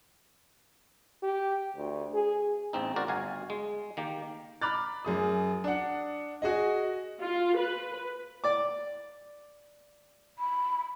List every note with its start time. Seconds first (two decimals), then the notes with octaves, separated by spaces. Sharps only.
1.23 G4
1.76 D2
2.14 G#4
2.73 A1 E2 C4 D#4
2.96 F#4 A#4 C5 D5
3.08 G1 F#4 F5 G#5
3.50 G#3
3.97 D#3 A#3 G4
4.62 A#5 B5 D6 F6 F#6 A6
5.05 F#2 G#4 D#6
5.64 D4 F#5
6.42 F#4 G#4 D#5
7.22 F4
7.57 B4
8.44 D5 D6
10.39 B5